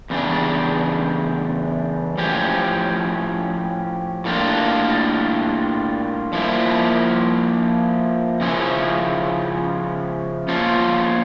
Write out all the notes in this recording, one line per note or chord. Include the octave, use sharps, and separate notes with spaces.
E2 C#3 G3 D4
A2 F3 C#4 G4
A2 G3 A#3 D4 F4
F3 A#3 E4
C#3 F3 C#4 E4
A#2 F3 C#4 F4